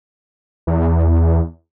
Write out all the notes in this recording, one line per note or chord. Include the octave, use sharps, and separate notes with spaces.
E2